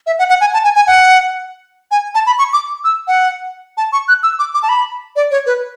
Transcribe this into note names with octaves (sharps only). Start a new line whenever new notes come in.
E5
F#5
F#5
G#5
A5
G#5
G#5
F#5
G#5
A5
B5
C#6
D6
E6
F#5
A5
C#6
F#6
E6
D6
D6
A5
B5
D5
C#5
B4